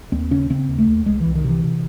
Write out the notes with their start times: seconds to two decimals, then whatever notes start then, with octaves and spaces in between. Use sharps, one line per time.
0.12 D#2 C4
0.31 C#3 C#4
0.50 C#3 C4
0.68 D#2
0.78 A3
0.88 D#2
1.06 C2 G#3
1.21 C2 E3
1.35 D#3
1.44 C3 E3
1.64 C3